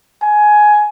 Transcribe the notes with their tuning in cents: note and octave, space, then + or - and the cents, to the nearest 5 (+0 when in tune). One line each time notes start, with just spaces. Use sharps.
G#5 +15